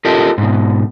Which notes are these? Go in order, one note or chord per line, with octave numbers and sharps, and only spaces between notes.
F4 G4 A4 A#4 D#5
G#2 B2